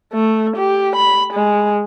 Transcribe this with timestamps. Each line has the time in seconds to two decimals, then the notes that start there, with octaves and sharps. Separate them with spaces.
0.13 A3
0.57 G4
0.96 B5
1.33 G#3